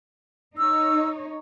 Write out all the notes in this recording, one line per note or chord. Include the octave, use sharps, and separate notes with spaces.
D#4 C#5 E6